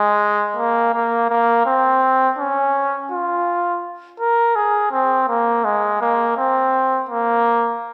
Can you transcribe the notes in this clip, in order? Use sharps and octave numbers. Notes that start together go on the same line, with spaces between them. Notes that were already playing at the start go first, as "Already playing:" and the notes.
Already playing: G#3
A#3
A#3
A#3
C4
C#4
F4
A#4
G#4
C4
A#3
G#3
A#3
C4
A#3